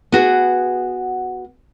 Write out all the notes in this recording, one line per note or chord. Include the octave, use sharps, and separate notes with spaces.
B3 F#4 G#4